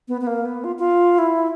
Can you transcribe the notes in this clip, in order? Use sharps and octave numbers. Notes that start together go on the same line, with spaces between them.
B3
B3
A#3
B3
F4
F4
E4